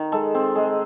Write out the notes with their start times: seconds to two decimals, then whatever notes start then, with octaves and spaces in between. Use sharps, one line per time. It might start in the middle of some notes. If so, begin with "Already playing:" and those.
Already playing: D#3
0.12 G#3 A4
0.35 C4
0.56 G#3